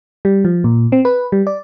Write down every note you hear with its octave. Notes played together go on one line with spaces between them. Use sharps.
G3
F3
A#2
C4
B4
G3
D5